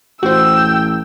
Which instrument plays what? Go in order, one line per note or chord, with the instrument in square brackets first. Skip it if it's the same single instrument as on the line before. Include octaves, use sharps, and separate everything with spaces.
[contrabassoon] A1 [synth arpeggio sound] F#4 C5 [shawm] G5 [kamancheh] E6